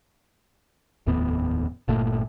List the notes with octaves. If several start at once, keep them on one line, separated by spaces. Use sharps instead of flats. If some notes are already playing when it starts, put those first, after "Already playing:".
F1 D#2 A2 B3
G1 A#2 A3